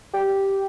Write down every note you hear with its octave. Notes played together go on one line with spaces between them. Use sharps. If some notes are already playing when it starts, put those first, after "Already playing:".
G4